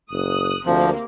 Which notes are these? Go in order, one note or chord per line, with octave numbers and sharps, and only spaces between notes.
F#1 D#6 F#6
D2 C3 F3 A#3